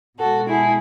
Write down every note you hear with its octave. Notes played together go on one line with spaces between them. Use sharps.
B2 G#3 F#4 A4
E4 G#4